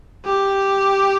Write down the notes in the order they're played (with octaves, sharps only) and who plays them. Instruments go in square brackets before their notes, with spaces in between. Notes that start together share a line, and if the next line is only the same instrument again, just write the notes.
[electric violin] G4